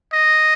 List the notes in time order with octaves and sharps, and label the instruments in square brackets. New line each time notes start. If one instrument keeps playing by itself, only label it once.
[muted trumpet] D#5